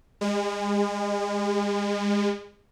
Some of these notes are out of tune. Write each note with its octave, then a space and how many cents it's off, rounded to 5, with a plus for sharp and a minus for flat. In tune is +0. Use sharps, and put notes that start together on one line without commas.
G#3 -35